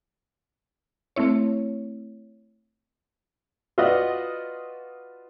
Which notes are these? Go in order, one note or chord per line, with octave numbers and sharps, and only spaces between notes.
A3 C4 E4 C#5
F4 F#4 B4 D5 D#5